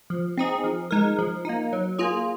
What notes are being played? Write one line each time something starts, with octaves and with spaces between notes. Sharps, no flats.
F3
C4 D#4 G#4
F3
G#3 D#4 A#4
F3
A#3 D#4
F#3
A#3 F4 G#4